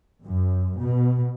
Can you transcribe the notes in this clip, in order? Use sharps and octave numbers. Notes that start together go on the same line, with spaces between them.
F#2
B2